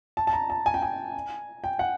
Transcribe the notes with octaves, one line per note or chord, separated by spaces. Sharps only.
A5
A5
A#5
A5
G#5
G5
G#5
G5
F#5